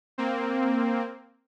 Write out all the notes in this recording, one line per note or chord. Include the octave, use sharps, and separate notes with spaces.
A#3 C4